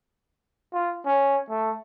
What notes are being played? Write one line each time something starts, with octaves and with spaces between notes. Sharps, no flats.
F4
C#4
A3